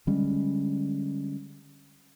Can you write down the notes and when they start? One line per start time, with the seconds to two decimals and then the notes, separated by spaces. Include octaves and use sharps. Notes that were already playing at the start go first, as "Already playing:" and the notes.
0.07 D3 G3 G#3 C#4